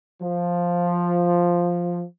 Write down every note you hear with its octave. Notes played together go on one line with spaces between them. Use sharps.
F3